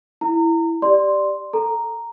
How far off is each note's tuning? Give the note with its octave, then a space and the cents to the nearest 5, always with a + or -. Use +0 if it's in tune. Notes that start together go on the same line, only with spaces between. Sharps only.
E4 +5 A#5 -25
G4 +0 D5 +5 C6 +0
A4 +5 A#5 +0